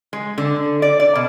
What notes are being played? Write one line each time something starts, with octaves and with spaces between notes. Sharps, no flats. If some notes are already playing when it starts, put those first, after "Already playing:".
G#3
D3
D5
D5
B2